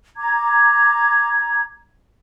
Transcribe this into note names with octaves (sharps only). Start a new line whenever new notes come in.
A#5 D6 G#6